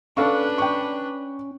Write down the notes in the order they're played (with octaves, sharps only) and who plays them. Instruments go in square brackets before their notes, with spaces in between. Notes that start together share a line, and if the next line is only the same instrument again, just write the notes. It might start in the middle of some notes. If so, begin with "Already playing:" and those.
[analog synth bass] C#4 [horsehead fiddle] D4 B4 [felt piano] A4 F5 C#6
[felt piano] G5 C#6